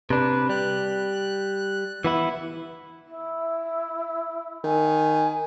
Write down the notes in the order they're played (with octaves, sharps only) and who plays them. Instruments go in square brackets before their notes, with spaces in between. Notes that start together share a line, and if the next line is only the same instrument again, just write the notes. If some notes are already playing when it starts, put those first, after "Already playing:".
[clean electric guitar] C3 D4 [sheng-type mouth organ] B4
[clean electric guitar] G3 [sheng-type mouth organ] F#6
[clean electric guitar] E3 B3 E4
[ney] E4
[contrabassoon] D#3 [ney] G#5